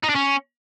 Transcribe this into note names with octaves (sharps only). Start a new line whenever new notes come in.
D#4
D4
C#4